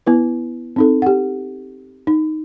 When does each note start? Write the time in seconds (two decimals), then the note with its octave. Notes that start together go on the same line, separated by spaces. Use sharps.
0.06 B3 E4 B4
0.76 C4 D#4 A4
1.02 G4 F#5
2.07 D#4